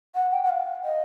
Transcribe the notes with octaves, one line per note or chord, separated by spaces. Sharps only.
F#5
G5
F#5
F5
D#5